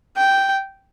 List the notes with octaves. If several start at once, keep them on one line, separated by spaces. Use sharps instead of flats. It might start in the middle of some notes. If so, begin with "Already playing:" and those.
G5